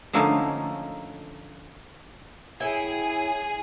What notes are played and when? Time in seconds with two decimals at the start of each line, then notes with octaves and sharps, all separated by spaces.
0.13 D3 F3 A3 A#3 C#4 D#4
2.60 E4 G#4 C#5 G5 G#5